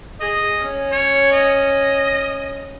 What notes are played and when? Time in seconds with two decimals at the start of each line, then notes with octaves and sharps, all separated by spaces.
0.20 G#4 D#5
0.59 C#4
0.92 C#5
1.32 D#5